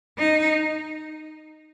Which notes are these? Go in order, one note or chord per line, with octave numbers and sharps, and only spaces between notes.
D#4